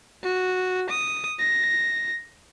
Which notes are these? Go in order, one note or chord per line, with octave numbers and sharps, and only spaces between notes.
F#4
D#6
A#6